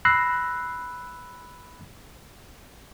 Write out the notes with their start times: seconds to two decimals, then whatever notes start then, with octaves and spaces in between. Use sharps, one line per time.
0.05 B5 E6 F#6 A#6 C7